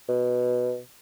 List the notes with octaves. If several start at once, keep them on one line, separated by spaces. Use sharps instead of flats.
B2